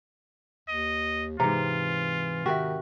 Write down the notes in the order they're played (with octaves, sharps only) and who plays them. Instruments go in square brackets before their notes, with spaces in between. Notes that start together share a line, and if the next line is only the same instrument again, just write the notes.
[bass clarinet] D#2 [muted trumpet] D#5
[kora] G#2 C3 [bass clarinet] E3 [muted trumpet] F4 [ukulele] A#5
[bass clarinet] D#3 [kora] F#4 A#4 [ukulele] G4 E5